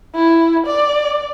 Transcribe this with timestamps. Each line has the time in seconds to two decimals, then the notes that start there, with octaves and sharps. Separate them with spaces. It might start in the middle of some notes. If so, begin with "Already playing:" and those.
0.15 E4
0.67 D5